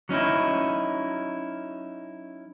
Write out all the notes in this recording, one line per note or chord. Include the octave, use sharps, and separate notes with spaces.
F#3 C#4 D#4 E4